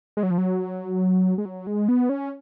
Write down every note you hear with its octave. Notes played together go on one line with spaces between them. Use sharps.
G#3
F#3
F3
F#3
G#3
F#3
G#3
B3
C#4